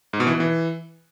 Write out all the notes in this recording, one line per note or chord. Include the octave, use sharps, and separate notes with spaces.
G#2
B2
E3
B2
E3